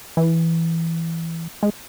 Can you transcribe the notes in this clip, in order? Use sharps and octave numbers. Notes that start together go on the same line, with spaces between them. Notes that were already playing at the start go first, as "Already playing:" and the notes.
E3
G#3